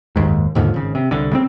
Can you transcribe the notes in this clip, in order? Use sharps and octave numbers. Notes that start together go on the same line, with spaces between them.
F#1 D#2 G#2
D#2 G#2 D3 F3
G#1 C#3
C3
C2 D3
C#3 G#3 C4